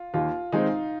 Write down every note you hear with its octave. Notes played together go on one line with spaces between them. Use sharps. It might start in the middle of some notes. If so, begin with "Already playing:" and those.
Already playing: F4
D#2 F4
D#3 G#3 C4 D#4